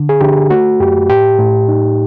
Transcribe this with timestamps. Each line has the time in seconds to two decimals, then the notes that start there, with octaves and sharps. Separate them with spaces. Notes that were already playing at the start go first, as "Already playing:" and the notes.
Already playing: D3
0.09 G#4
0.21 D3 G4
0.51 A3 F#4
0.80 F#2 G4
1.10 A2 G4
1.39 A2
1.68 D#4